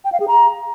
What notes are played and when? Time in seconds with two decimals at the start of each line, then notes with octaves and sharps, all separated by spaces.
0.05 G5
0.12 F5
0.20 G#4
0.28 A#5